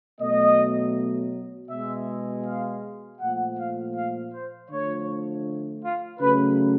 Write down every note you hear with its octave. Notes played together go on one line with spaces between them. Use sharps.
B2 F#3 A3 D#5
B2 G#3 E5
F5
A#2 F3 A3 F#5
F5
F5
C5
D3 F3 A3 C#5
F4
C#3 F#3 A3 B4